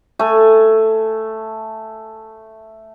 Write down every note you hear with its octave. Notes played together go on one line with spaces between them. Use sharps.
A3 G#5